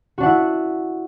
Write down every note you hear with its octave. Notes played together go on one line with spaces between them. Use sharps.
D4 E4 F#4 F#5